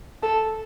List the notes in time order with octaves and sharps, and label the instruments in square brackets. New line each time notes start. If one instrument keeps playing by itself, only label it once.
[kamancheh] A4